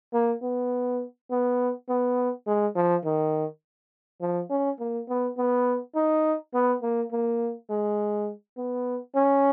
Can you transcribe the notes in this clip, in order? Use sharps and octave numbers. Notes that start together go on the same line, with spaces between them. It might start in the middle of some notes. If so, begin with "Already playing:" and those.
A#3
B3
B3
B3
G#3
F3
D#3
F3
C#4
A#3
B3
B3
D#4
B3
A#3
A#3
G#3
B3
C#4